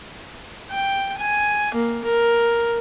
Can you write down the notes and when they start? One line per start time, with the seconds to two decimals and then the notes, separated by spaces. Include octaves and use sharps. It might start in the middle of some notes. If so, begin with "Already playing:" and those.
0.71 G5
1.19 G#5
1.74 A#3
2.04 A#4